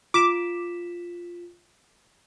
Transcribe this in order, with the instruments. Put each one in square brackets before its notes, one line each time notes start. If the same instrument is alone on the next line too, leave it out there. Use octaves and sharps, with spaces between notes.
[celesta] F4 B6 E7 [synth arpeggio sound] D6